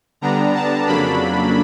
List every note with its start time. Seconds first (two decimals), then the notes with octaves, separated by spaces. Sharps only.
0.21 D3 G3 B3 D4 A#5
0.54 A5
0.87 F2 C#3 F#3 A#3 D4 B5